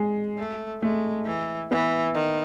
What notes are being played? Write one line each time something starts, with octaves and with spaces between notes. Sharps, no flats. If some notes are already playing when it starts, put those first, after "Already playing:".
Already playing: G#3
A3
G#3 A3
E3
E3 B3
D#3